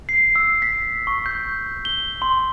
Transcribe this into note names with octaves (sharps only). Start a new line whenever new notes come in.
C7
E6
B6
C#6
G6
G7
C6